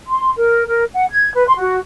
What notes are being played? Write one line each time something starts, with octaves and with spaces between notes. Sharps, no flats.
C6
A#4
A#4
F#5
G#6
B4
C6
F#4